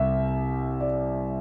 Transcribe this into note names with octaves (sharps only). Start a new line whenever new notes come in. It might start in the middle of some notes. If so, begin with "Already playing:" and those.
Already playing: C2 C3 E5
D5